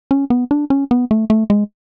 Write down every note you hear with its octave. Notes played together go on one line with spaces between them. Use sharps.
C#4
B3
D4
C#4
B3
A3
A3
G#3